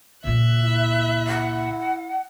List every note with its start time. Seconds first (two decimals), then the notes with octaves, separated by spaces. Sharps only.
0.24 C#2 A#2 E5 F#6
0.62 E4
1.27 F#5